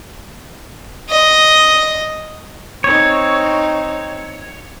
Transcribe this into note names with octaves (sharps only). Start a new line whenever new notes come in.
D#5
C4 D#4 C#5